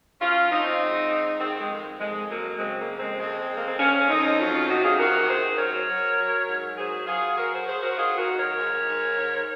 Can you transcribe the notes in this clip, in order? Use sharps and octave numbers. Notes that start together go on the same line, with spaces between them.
F3 C#4 F4
F3 C4 D#4
G#2
G#2
D#3 G#3 C4
G#3
F2
F2 G#3
F#3 A#3
C#3 G#3 C4
A#3
F2
G#3 C4
F2 G#3 C4
F2
A#3
C4
F2 A#3 C#4
F2 C4 D#4
F#3 C#4 F4
C#4 F4
C3 D#4 F#4
F4 G#4
D#3 F#4 A#4
F#2 G#4 C5
F#3 A#4 C#5
F#3
F#3
G#2
F#3 G#4 C5
F#3 F4 G#4
F#3 F#4 A#4
G#4 C5
F#3 G#4 C5
F#4 A#4
D#3 F4 G#4
F#4 A#4
D#3
A#4 C#5
G#2
G#2
G#2